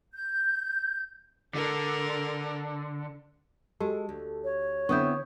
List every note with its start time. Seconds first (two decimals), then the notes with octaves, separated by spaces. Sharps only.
0.13 G6
1.55 D3 A4 A#4
3.80 G#3 F#4 G4 A4
4.09 D2
4.44 C#5
4.89 D3 B3 C4 E4 C#6 D#6 G6